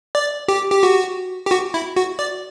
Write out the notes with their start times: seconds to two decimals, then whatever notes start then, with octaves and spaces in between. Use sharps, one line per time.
0.15 D5
0.48 G4
0.72 G4
0.83 F#4
1.46 G4
1.51 F#4
1.74 E4
1.96 F#4
2.19 D5